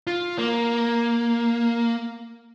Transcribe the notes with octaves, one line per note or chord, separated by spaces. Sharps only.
F4
A#3